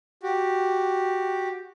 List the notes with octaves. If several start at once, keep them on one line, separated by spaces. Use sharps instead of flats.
F#4 G4